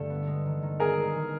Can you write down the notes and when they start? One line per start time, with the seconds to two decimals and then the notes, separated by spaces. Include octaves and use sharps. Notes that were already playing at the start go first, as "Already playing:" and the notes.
Already playing: G2 D3 A3 A4
0.10 B3
0.27 G#3
0.46 D#3
0.63 D#3
0.80 B3 G#4 A#4
0.97 G#3
1.15 D#3